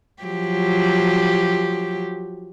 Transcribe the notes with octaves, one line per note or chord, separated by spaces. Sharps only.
F3 F#3 G4